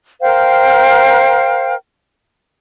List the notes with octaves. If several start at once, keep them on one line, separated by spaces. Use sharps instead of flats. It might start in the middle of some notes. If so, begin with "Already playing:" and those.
A#4 C5 F5 G5